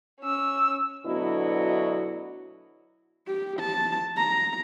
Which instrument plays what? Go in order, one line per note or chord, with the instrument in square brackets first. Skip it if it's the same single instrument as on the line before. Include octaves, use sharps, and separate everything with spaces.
[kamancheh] C#4 E6
[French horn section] D2 B2 F#3 D4 E4 D#5
[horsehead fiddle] G4
A5
A#5